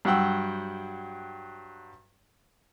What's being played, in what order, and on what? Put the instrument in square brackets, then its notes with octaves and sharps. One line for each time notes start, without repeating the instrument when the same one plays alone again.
[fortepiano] G2 F#3 F#5 G5 E6